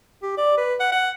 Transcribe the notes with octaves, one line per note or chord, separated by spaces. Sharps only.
G4
D5
B4
F#5
F#5